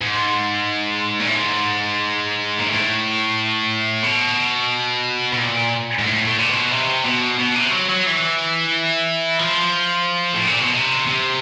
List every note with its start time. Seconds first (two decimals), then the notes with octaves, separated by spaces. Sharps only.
0.01 G#2
1.20 A#2
1.28 A2
1.35 G#2
2.59 A#2
2.70 A2
4.04 B2
5.33 B2
5.37 A#2
5.99 G#2
6.05 A2
6.27 A2
6.39 A#2
6.49 B2
6.71 C3
7.05 B2
7.39 B2
7.55 C3
7.71 F#3
7.89 F#3
8.06 E3
9.39 F3
10.34 A2
10.47 A#2
10.60 B2
10.74 C3
11.07 C3